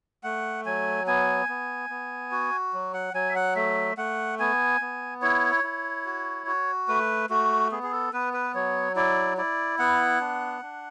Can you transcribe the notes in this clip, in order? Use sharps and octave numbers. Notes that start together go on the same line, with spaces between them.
A3 F#5
F#3 G#5
B3 G#5
B3
B3
F#4
F#3
F#5
F#3 G#5
E5
F#5
A3 E5
A3 F#5
B3 G#5
B3
E4 C#5
E4
F#4
F#4
A3 B4
A3 F#4
B3 G#4
G#4
A4
B3 B4
B4
F#3 C#5
E4 D5
E4 D5
B3 F#5
D4
D4